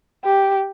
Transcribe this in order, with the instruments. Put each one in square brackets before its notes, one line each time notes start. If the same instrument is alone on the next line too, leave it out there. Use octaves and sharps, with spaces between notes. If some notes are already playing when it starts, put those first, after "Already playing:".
[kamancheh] G4